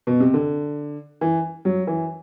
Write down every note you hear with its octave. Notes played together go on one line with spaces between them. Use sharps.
B2
C3
D3
E3
F#3
E3